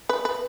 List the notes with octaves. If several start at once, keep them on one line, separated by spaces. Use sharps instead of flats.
B4
B4